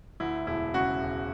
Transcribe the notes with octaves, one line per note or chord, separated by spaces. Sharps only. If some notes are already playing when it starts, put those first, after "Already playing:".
D2 E4
E1 E4
C#3 F#4
E1